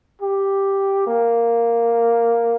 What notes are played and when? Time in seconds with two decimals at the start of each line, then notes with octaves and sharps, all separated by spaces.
0.22 G4
1.07 A#3